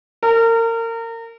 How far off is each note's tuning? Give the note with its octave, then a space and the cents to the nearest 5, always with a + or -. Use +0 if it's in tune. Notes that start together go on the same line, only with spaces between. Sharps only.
A#4 -30